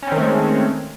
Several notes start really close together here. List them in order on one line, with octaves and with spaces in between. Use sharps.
C#4 C4 D#3 A3 G#3